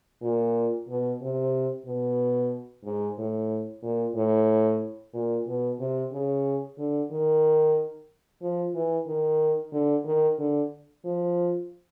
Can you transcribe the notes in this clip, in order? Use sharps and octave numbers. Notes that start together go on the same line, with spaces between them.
A#2
B2
C3
B2
G#2
A2
A#2
A2
A#2
B2
C3
C#3
D3
D#3
F3
E3
D#3
D3
D#3
D3
F3